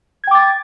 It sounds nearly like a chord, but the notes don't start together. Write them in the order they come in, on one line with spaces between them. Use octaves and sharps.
G#6 G5 D6 A6